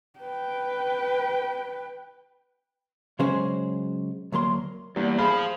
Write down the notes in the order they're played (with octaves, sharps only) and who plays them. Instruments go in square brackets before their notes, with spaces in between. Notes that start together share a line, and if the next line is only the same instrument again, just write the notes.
[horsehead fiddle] B4 G5
[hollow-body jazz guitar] C#3 F#3 G#3 C#4 C5
D2 F#3 A#3 C6
[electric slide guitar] E2 [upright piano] G3 A#3 D4
[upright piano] G#4 B5 [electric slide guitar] C5 F5